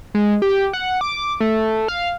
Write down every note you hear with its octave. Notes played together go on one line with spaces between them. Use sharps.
G#3
G4
F#5
D6
A3
F5